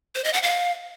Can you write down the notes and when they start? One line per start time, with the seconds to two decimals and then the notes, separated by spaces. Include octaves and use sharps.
0.15 C5
0.24 D#5
0.33 F#5
0.42 F5